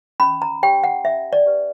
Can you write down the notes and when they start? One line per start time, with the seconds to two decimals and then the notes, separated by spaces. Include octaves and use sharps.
0.20 C#4 B5
0.42 A#5
0.63 G4 C#5 G5
0.84 F#5
1.04 C#4 E5
1.33 D5
1.46 G4 B4